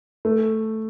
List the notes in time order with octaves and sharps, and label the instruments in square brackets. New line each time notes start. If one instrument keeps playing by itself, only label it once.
[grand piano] A3